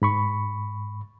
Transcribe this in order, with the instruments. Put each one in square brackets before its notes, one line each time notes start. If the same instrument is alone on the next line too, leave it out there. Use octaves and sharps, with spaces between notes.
[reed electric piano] G#2 B5 C#6